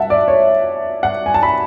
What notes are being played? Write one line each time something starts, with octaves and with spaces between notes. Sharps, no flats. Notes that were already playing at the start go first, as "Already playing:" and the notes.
Already playing: E5 F#5 A5
D5
C#5
F#5
G#5
A5
B5